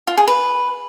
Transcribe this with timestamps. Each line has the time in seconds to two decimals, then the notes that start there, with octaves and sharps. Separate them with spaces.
0.07 F4
0.17 G#4
0.28 B4